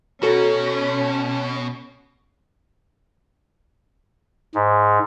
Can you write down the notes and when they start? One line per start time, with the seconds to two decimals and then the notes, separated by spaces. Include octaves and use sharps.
0.23 B2 C#4 F#4 A4 A#5
4.55 G#2